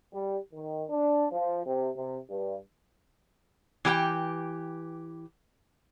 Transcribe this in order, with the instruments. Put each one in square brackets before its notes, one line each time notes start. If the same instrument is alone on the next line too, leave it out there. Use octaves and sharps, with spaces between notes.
[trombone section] G3
D#3
D4
F3
C3
C3
G2
[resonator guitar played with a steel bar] E3 G4 A#4 G5